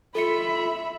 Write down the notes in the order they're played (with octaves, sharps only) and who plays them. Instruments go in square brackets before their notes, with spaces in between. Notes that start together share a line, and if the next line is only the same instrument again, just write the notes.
[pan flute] F4 [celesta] A4 C#7 [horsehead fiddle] E5 B5